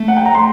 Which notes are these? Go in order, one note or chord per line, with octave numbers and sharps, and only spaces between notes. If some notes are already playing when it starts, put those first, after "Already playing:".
Already playing: A3
F#5
G5
A#5
C6